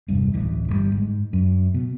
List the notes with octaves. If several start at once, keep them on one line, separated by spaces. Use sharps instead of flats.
E1 C2 G2
D1 A1 E3
G1 C#3 G3
G#2
F#2
B2